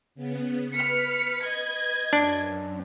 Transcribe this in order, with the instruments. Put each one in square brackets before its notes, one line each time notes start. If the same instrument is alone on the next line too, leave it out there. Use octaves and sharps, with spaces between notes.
[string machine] C#3 B3
[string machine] B4 [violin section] F6 B6 C#7
[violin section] D#5 G#6
[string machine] F#2 [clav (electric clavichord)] D4